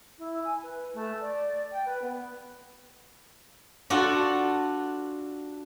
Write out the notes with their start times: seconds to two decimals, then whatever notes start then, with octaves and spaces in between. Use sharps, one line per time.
0.19 E4
0.45 G#5
0.63 B4
0.94 A3
1.21 D5
1.72 G5
1.86 B4
2.02 B3
3.90 D4 F4 F#4 A4